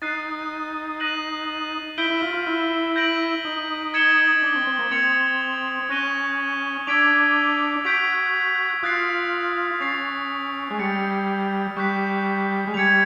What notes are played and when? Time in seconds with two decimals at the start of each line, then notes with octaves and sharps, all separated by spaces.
0.02 D#4 F#6 A6 C7 D#7
1.00 F#6 A#6 D#7 F#7
1.98 E4 G6 B6 D7 G7
2.10 E4
2.22 F4
2.34 F4
2.47 E4
2.96 G6 A#6 D7 F#7
3.45 D#4
3.94 D#6 G#6 C#7 E7 G7
4.43 D4
4.55 C4
4.67 C4
4.79 A#3
4.91 C4 D#6 G#6 C#7 F7
5.89 C#4 D#6 F#6 A#6 D#7 G7
6.87 D4 E6 G#6 B6 D7 F7
7.85 F#4 G6 B6 D7 F7
8.83 F4 D#6 F#6 A6 C7
9.81 C#4 A6 C7 F7
10.71 G#3
10.79 G3 A6 C#7 F7
11.76 G3 C#6 F#6 B6
12.67 G#3
12.74 G3 G#6 C#7 F7